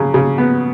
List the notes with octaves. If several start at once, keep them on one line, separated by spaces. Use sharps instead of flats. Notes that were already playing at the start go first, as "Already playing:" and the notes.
Already playing: C#3 F#3
C#3
B3